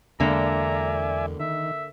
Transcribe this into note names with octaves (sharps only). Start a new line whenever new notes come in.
E2 D3 G#3 A#3 D5 E5 G#5 A#5
D#3 E5